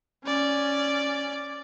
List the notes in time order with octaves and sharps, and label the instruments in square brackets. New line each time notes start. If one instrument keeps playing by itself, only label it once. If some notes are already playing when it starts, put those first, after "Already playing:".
[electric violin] C#4 D5